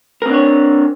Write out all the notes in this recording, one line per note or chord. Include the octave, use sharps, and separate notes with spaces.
C4 D4 A#4 C#5